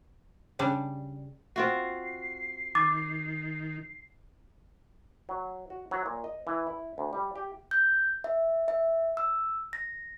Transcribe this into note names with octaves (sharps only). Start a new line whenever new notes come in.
C#3 G3 D4
C4 F4 F#4 C7
D#3 D6 A6
F#3
F#4
F#3
A#2
D#5
E3
E4
D2
G3
G4
G6
E5
E5
E6
A#6